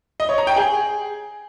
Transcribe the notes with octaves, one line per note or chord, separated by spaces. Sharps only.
D#5
C#5
A#5
G5
G#4